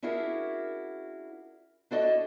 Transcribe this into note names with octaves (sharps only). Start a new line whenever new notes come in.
C#4 D4 E4 F#4 G#4 A#4
D4 E4 F#4 A4 D5 D#5